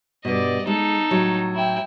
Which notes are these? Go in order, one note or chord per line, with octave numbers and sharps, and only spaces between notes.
G2 B2 D5 D#5
G#3 D#4 A4
A2 F#3
E4 G5